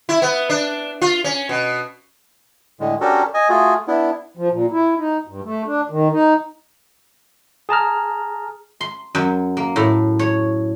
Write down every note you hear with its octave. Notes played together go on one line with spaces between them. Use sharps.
E4
B3
D4
F4
C#4
B2
A2 D3 G#3
C#4 D4 F#4 G4 A4 A#4
D#5 G#5
A3 F4 F#4 G#4
B3 D4 E4
F3
A#2
E4
D#4
G2
A3
D4
D#3
D#4
G#4 A5 A#5 F6
C6
F#2
A#3
A2
C#5